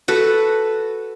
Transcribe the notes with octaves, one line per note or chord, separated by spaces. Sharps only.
F#4 A4 B4